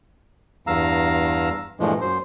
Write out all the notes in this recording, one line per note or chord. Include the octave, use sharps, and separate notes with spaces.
E2 G2 F5 A#5 E6
G2 A#2 E3 F3 G#3 A3
F#2 C5